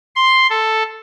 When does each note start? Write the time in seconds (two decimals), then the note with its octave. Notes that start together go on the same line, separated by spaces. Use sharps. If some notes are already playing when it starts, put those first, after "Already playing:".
0.16 C6
0.50 A4